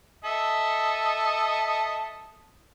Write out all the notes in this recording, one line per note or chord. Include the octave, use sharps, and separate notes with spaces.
A4 D#5 E5